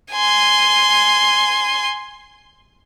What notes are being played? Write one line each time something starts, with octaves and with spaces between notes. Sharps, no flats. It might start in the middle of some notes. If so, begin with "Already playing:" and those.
G#5 C6